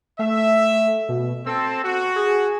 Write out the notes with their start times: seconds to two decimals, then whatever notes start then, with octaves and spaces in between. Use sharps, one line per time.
0.19 A3 E5
1.09 B2
1.46 C4 A4 E6
1.83 F#4
2.16 G#4